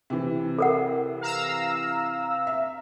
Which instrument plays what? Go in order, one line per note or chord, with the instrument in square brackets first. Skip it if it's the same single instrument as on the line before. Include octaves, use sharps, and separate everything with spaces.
[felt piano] C3 E3
[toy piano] A4 A#4 F#5
[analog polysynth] F5 A#5 E6
[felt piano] E5